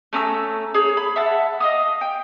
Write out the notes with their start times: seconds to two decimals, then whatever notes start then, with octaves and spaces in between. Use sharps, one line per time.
0.13 A3 C#4 A#5 E6
0.74 G#4 C#5
0.97 B5
1.16 E5 F#5 A5
1.60 D#5 F5 D#6
2.01 G5